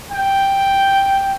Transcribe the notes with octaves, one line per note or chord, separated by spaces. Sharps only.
G5